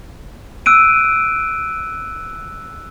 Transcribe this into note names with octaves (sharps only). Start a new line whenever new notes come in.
E6 F#6 D7 D#7